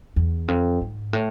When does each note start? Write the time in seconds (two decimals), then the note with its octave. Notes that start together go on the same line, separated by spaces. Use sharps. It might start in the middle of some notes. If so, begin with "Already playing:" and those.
0.16 E2
0.48 F2
0.81 G#2
1.13 A2